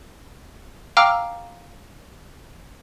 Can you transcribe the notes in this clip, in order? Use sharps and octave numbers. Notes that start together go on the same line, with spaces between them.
F5 G5 A#5 D6 E6 F6